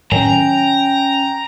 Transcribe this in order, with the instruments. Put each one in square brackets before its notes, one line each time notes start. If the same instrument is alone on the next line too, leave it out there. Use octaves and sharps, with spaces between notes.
[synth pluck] A2 D#3 F#3 [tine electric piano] C#4 G#5 [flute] G5 [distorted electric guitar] A#5